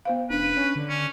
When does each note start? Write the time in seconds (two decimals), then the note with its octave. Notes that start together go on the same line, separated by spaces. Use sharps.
0.05 B3 C5 F5
0.30 E1 C#4 D4 B4
0.57 C#4 C#5
0.76 D3
0.89 C#4